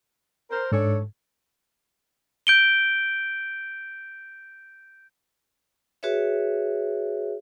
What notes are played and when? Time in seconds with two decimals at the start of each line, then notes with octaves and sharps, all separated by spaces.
0.50 A#4 C5
0.72 G#2 D4 A4 C#5
2.47 G6 D7 G7
6.03 F#4 G#4 B4 C#5 E5